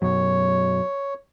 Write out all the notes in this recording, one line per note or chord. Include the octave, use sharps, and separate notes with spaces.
F#2 B2 F#3 C#5